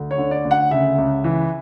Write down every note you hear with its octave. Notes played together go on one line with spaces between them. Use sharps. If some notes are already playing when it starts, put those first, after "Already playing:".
Already playing: D2
C#5
D3
D5
D2
F#5
C#3 E5
C#2
E3